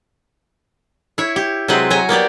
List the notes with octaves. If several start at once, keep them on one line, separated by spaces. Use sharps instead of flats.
E4 C#5
G4
C3 F#3 G#3 C4 B4 F#5
F#3 C#5 G#5 A#5
A#3 B3 G4 D5